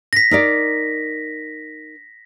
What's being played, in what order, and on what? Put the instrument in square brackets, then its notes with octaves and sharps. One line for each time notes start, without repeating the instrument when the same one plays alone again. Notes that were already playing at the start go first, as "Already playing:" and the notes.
[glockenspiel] A#6 B6
[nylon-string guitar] D#4 A#4 D5